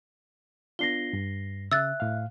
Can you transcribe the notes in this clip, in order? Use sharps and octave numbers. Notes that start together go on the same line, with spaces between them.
B3 D4 F4 A#6 C7 G7
G2
C#3 E5 E6 F#6 A6
A2 F5